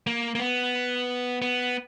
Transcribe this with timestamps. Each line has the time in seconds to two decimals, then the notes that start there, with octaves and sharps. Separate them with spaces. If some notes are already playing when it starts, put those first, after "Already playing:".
0.07 A#3
0.35 A#3
0.40 B3
1.42 B3